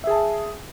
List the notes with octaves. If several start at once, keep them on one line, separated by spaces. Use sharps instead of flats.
G#4 E5 G#5 A5